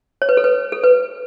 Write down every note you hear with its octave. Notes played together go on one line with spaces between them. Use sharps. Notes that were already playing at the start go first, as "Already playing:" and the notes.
C#5
B4
A4
B4
A4
B4